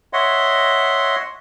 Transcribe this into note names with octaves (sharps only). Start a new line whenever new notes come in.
C#5 D#5 E5 F#5 C6